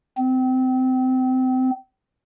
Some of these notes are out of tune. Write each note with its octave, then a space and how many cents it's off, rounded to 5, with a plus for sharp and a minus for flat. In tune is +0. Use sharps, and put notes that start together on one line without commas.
C4 -25